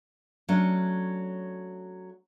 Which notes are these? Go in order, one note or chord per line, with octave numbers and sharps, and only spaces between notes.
F#3 A3 C#4 D4